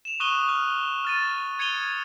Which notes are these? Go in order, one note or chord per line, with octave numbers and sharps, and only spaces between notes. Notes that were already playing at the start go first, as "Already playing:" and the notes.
E7 F7
C#6 D#6 F#6 D#7 F7 G7
F6 F#6 F7 G7
F6 A6 D#7
D#6 G#6 C#7 D#7 F7 G7